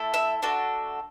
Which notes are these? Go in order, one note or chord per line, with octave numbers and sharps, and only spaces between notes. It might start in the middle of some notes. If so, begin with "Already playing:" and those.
Already playing: A3 E4 A4
E5 E6
A3 D4 F#4 A4